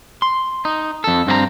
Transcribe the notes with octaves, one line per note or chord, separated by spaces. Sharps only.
C6
D#4
F2 A4
G2 C4 G#4 A#5